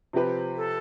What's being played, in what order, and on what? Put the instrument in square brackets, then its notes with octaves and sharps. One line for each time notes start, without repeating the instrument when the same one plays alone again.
[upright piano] C3 F3 C4 G4 B4
[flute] A4